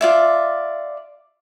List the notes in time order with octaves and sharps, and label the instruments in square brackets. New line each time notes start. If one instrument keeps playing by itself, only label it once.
[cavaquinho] F4 D5 E5